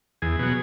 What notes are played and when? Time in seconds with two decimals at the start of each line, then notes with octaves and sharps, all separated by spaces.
0.22 E2 G#4
0.39 B2 F#3